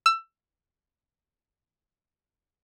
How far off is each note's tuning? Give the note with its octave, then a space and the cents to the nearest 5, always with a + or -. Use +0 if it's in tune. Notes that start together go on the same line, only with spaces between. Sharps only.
E6 +20